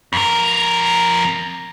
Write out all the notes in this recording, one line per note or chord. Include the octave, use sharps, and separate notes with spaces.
F2 A#4